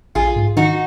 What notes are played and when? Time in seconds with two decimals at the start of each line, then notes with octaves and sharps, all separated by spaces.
0.15 A#1 F4 G#4
0.36 G#2
0.57 D#3 D#4 F#4